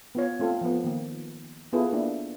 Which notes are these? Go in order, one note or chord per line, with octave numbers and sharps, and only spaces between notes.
B3 F4 C#5
A3 C4 F4 A4
F3 B3
D#3 A#3
B3 E4 F4 G#4 A4 B4
A#3 D4 E4